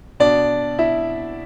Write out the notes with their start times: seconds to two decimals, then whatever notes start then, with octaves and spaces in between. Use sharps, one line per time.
0.20 B2 D4 D5
0.79 E4 E5